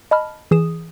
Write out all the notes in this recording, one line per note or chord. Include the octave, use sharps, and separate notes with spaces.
D#5 A5 B5 F6
E3 G#4 D#6 E7